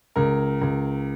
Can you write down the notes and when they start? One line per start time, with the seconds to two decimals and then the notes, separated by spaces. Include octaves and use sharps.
0.16 C#2 A#4
0.62 C#2